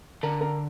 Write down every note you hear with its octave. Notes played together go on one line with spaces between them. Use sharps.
D3 A#4 A#5
A#4 A#5